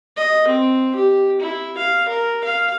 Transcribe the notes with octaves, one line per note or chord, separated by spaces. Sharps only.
D#5
C4
G4
E4
F5
A#4
F5